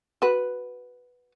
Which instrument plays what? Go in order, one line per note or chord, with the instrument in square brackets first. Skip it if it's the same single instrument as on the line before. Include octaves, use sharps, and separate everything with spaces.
[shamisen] F#4 B4